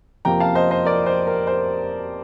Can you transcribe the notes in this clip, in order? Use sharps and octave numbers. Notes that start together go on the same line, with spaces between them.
F2 C3 F3 A#3 G5 A#5
F5 A5
C5 D#5
C5 D#5
A#4 D5
C5
A#4
C5